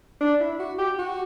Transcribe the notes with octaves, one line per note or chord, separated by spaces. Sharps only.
D4
E4
F#4
G4
F#4